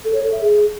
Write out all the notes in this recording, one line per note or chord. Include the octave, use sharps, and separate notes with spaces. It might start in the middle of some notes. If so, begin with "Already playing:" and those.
A4
C#5
A4
E5
G#4